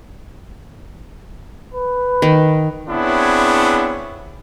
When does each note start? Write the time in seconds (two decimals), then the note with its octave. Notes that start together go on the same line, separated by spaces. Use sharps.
1.75 B4
2.22 D#3
2.88 B3 C4 D4 E4 G#4 C#5